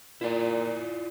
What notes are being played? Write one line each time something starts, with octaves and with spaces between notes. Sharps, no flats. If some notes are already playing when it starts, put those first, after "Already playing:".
A#2 E4 F4 D5